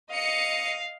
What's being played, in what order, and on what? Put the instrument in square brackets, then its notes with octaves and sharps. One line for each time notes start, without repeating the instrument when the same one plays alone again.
[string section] D#5 C#7 [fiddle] F5